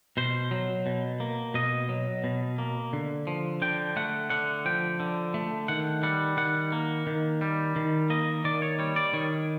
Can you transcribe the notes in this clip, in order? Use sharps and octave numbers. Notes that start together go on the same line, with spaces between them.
B2 C5
F#3
B2
A#3
B2 D#5
F#3
B2
A#3
D3
F3
D3 G5
A3 F#5
D3 F#5
F3 G5
D3
A3
D#3 F#5
G3 F#5
D#3 F#5
A#3
D#3
G3
D#3
A#3 D#5
D#3 D5
C#5
G3 C#5
D5
D#3 C#5